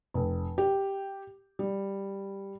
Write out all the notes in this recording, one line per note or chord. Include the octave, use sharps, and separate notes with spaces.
F1
G4
G3